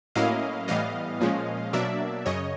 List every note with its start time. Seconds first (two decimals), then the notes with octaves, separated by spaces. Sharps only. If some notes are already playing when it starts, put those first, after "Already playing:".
0.16 A2 F#3 A#3 C#4 E4 D#5 F5
0.68 A2 E3 G3 B3 D#5 F5
1.21 A#2 F3 G#3 C#4
1.73 B2 F#3 A#3 D4 D5 E5
2.26 F#2 C#3 C#5 D#5